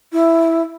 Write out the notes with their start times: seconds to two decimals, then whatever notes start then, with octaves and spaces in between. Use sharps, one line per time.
0.12 E4